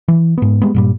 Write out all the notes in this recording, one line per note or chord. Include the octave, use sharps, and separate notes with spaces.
E3
G#2 B3
G3 G#3 B3
G2 A#2 G3